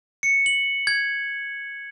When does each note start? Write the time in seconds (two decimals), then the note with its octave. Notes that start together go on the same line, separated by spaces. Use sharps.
0.23 C#7
0.46 F#7
0.87 G#6